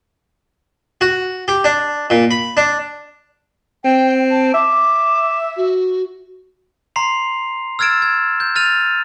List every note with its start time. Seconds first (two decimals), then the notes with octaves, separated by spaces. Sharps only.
1.01 F#4
1.48 G4
1.64 D4
2.10 A#2
2.31 B5
2.57 D4
3.84 C4 G5
4.31 A5
4.54 E5 D6
5.57 F#4
6.96 A#5 C6 C7 F7
7.79 E6 F6 G#6 A6 D7 E7
8.02 G#6
8.40 G6
8.56 F6 A6 D#7 F7